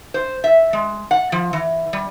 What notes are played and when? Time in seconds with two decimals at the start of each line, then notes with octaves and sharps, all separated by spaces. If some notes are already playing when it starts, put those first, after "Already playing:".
0.14 C5
0.44 E5
0.73 G#3
1.11 F#5
1.32 F3
1.53 E3
1.93 G3